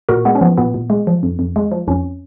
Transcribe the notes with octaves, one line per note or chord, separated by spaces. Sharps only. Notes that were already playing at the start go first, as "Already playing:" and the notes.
A#2 F#4 A#4
G#3 B3
C#4
F3 B3
A#2 B3
A#2
G#3
F3
F2
F2
G#3
F3
F2 C#4